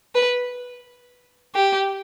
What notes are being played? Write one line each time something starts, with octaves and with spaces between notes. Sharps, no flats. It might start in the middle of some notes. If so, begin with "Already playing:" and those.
B4
G4